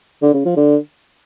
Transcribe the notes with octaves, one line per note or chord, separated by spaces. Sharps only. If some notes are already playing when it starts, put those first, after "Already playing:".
D3
C#3
F3
D3